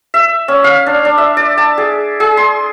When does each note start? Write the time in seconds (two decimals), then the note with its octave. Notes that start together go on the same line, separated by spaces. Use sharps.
0.14 E5
0.48 C#4
0.64 F5
0.86 D4
1.05 D4
1.18 E5
1.37 D5
1.57 A5
1.78 G#4
2.20 G#4
2.37 C6